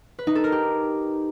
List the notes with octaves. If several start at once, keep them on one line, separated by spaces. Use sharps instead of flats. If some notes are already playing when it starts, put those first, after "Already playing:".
B4
D#4
A4
A#4
G4